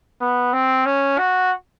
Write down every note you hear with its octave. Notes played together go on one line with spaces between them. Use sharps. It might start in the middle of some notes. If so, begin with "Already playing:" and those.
B3
C4
C#4
F#4